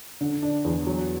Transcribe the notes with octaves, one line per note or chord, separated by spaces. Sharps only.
D3
D4
E2
F#3